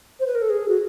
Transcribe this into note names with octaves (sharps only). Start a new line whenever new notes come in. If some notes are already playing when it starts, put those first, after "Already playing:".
C5
B4
A#4
A4
G#4
F#4